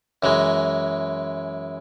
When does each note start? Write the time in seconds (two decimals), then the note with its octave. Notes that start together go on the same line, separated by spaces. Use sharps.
0.23 F#2 E3 G#3